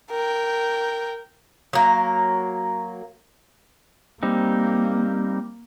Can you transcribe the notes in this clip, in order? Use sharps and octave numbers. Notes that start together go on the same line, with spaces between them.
A#4 G5
F#3 A#3
G3 A#3 C4 D#4